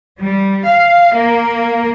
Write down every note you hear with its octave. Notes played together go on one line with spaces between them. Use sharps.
G3
F5
A#3